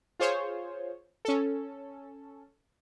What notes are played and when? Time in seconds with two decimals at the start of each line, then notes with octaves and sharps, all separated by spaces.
0.20 F4 G#4 C5 C#5
1.25 C#4 A4